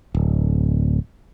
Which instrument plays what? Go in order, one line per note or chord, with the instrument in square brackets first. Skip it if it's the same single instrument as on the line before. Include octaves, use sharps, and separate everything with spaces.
[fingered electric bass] D1